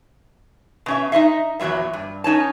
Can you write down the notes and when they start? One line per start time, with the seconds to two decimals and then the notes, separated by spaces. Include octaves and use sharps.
0.86 B2 C#4 E5
1.12 D#4 F4 D#5 E5
1.60 E2 A#2 F#3 G3 E5
1.93 G2
2.24 C#4 D#4 C#5 A5